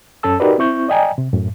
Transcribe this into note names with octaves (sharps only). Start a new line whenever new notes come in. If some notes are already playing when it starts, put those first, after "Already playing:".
F#2 C#4 A4 A5 E6
D#4 F#4 G4 A#4 B4 D5
C4 E4 C#6 G6
D5 D#5 G5 G#5 A#5
C3
F#2 A2